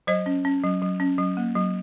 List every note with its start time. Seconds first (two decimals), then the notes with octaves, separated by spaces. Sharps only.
0.07 F#3 C5 D#5
0.26 C#4
0.45 C#4
0.64 F#3
0.82 F#3
1.00 C#4
1.18 F#3
1.37 A#3
1.56 F#3